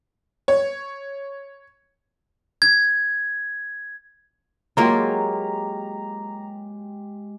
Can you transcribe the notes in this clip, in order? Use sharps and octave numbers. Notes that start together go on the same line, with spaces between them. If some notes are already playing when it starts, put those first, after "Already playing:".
C#5
G#6
F#3 G#3 A#3 F4 G4 A#5